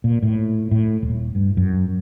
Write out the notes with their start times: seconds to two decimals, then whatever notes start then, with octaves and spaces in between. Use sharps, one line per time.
0.04 A#2
0.23 A2
0.71 A2
1.03 D#1
1.35 G2
1.57 F#2